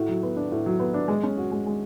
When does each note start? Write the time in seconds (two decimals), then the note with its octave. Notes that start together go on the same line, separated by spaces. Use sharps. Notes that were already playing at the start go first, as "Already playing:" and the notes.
Already playing: A2 F#4
0.09 F#3
0.23 B3
0.37 D4
0.52 A2
0.66 F#3
0.80 B3
0.94 D4
1.08 G#3
1.23 C#4
1.38 F#4
1.51 G#3
1.66 G#3